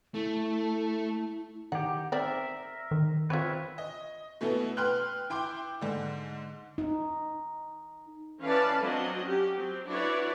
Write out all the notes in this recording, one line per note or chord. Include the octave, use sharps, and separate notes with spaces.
A3 E4
D#3 G4 F#5
C4 A#4 D5 E5
D#3
C4 F4 B4 C#5 E5
D#5
B2 A3 B3 E4
B4 G5 C6 F6 F#6
E4 G5 C6 D6 G6
G#2 D3
D#4
E3 C#4 B4 D5 F5 A5
F#3 C4 D4 D#5
C#4 G4
F#3 C4
D4 E4 F#4 B4 C#5 D5